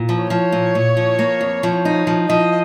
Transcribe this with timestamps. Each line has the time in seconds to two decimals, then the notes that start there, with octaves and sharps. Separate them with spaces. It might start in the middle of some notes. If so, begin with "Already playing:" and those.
Already playing: A#2
0.09 F3
0.23 C#5
0.30 F3
0.53 A#2
0.75 A#2
0.97 F3
1.19 A#3
1.41 F2
1.63 F3
1.85 D#4
2.07 F3
2.29 F3 D#5